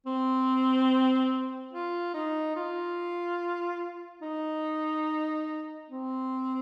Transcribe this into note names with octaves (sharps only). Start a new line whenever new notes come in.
C4
F4
D#4
F4
D#4
C4